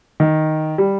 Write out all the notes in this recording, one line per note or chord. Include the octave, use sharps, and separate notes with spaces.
D#3
G3